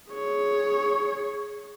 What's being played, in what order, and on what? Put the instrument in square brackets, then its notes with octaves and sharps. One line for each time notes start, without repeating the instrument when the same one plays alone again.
[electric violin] G#4 C#5